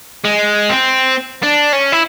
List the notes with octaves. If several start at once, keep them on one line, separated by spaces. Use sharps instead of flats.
G#3
C4
D4
C#4
E4